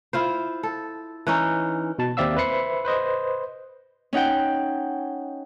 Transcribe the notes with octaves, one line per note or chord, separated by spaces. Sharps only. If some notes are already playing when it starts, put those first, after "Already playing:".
E4 F4 C5
A4
E3 C#4 D#4
B2 A5
D#2 C4 D5 E5 F5 E6
B4 C5 E5 B5 C7 C#7
B4 C5 D#5
C#4 D#4 F#5 G5